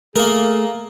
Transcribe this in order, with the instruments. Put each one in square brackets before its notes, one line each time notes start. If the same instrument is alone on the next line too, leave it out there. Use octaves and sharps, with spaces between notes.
[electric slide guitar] A3 [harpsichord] A#3 A#4 [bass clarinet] G#4